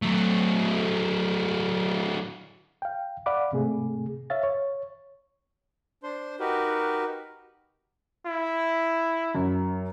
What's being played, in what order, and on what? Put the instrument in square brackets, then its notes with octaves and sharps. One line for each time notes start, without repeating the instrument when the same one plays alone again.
[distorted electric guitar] F#3 A3
[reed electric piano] F5 G5
D5 F5 F#5 B5 D6
G#2 C3 A3 G#4
C#5 E5 F5 A6
C#5
[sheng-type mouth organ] D4 C5 C6
D#4 F#4 G4 A#4 B4
[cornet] E4
[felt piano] F#2